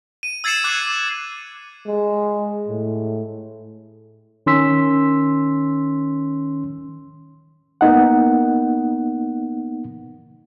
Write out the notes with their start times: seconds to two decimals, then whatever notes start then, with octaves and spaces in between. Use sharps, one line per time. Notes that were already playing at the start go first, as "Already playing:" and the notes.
0.23 D#7
0.44 E6 G#6 A6 C7 C#7 E7
0.64 D6 F#6 G#6
1.86 G#3
2.68 A2
4.46 D#3 C#4 C6 E6 B6
7.81 A#3 B3 D#4 F#5